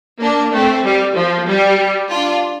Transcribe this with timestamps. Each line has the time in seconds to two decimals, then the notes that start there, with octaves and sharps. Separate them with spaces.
0.21 A#3 D4
0.53 A3 C4
0.84 G3
1.15 F3
1.47 G3
2.09 D4 F4